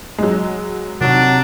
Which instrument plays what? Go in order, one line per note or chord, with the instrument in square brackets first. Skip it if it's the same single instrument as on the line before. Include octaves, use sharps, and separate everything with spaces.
[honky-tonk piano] F#3 G#3
[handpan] C3 [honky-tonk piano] D#3 [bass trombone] F#3 [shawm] D4